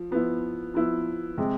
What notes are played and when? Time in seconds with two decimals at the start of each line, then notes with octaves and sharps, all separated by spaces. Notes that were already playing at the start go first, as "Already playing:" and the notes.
Already playing: F3
0.11 F3 B3 E4
0.74 F3 B3 E4
1.38 C3 G#3